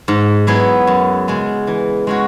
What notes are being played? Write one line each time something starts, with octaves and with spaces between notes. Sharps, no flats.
G#2
F#3 B3 E4 G#4
F#2
C#3 G#3
E3
G#3 C#4 F#4